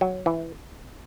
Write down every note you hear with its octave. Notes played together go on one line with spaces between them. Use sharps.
F#3
E3